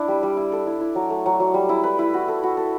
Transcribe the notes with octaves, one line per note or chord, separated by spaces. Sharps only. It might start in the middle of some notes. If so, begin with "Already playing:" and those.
Already playing: D4 E4 D5
G3
G3
E4
A4
E4
E4
F#3
A3
F#3
F#3
G3
E4
B4
E4
F#4
A4
F#4
A4